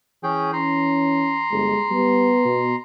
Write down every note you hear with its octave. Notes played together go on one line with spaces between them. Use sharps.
E3 C#4 G#4 G5
C#4 A#5 C6
G1 G#3
G3 B3
B2